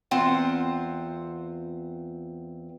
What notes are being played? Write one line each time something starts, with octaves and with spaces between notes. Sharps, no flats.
E2 C4 F4 F#5